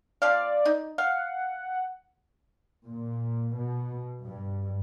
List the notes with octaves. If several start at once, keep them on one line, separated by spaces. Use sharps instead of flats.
F3 C4 D5 F5
D#4
F5 F#5
A#2
B2
G2